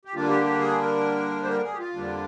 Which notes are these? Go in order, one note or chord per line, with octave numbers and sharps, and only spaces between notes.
G4
D3 G3 A#3 D4 F4
G4
G4
G#4
A#4
C5
A#4
G#4
G4
F4
F2 D3 G3 A#3 D4